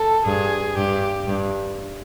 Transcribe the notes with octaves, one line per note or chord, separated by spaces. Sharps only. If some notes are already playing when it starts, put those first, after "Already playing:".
Already playing: A4
G2 G#4
G2 G4
G2